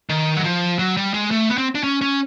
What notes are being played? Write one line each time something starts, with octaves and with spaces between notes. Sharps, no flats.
D#3
F#3
F3
F#3
G3
G#3
A3
B3
C4
D4
C#4
C#4